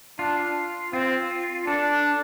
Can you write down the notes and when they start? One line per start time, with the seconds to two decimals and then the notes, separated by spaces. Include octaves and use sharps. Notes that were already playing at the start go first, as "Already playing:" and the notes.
0.19 D4 F4
0.93 C4 F4
1.67 D4 A4